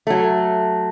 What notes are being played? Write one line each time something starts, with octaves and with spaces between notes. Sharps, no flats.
F#3 A3